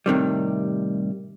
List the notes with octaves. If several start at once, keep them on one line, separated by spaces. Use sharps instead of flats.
A2 C3 D#3 G3